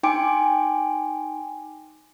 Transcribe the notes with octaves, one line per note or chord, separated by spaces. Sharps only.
D#4 G5 G#5 C6 D6 D7